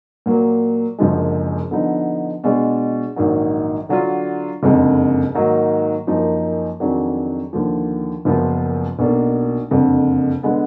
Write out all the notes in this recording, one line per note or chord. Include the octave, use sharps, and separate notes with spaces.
A#2 F#3 A#3
F#1 F#2 D3 F3 G#3
D3 F3 B3 D#4
B2 G#3 D4 G#4
A#1 G#2 D#3 F#3
D3 F#3 D4 F4
F#1 F2 D3 G#3 D#4
G#2 D#3 F#3 A#3 D#4
F#2 F3 A#3 D#4
F2 D#3 F#3 D4 G#4
D#2 D3 F3
F#1 F#2 F3 B3 F4
B1 B2 A#3 D4
F#1 F2 D3
D3 G#3 B3